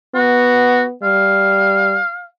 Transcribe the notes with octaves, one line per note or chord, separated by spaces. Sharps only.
B3 F#4
G3 F5